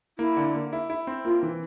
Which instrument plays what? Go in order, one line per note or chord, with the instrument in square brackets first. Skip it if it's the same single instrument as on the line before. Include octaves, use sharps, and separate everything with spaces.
[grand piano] A#3 [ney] E4
[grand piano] D3
A#3
E4
E4
C4
[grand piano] A#3 [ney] F4
[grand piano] E3